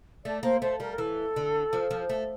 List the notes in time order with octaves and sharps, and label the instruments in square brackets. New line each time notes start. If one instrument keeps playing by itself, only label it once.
[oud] A3 [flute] D5
[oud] A#3 [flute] C5
[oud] A3 [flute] C5
[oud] G3 [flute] A#4
[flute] A#4
[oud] E3 [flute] A4
[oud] D3
F3
F3
A3